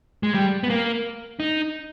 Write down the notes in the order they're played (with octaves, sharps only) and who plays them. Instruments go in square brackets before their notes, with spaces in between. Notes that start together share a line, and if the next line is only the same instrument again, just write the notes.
[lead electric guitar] G#3
G3
B3
A#3
D#4